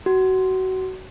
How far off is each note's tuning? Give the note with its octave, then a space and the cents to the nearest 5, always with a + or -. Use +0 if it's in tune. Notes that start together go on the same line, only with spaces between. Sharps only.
F#4 +25